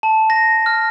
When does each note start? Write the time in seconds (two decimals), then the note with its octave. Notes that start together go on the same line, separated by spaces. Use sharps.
0.03 A5
0.30 A#6
0.66 F6